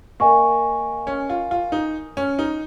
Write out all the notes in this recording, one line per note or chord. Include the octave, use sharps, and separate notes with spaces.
A#3 A#4 D#5 G#5 C#6
C#4
F4
F4
D#4
C#4
D#4